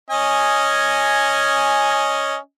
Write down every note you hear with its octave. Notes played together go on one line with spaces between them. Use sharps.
C#4 D#5 G#5